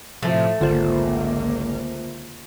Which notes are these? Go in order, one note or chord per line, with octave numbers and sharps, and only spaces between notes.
A2 C3 F3 A3
G#1 C#2 D3 A#3 F4 C5